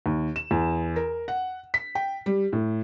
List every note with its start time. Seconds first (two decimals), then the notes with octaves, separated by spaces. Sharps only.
0.06 D#2
0.36 E7
0.51 E2
0.96 A#4
1.28 F#5
1.74 B6
1.95 G5
2.26 G3
2.53 A2